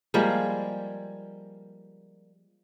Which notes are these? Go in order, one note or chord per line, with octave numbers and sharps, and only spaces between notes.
F3 G3 G#3 A#3